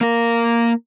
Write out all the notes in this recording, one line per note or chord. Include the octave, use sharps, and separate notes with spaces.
A#3 A#4